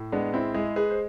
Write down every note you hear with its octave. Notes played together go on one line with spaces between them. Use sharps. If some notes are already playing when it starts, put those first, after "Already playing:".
Already playing: A2
G#3 B3 D4
C4 E4
G#3 E4 G#4
G#4 B4
C5